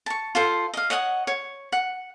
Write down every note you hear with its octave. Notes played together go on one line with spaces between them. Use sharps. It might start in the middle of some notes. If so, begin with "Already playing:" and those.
A5 C#6
F4 A4 C5
D#5 F5
C#5 D#5 F#5 D#6
C#5
F#5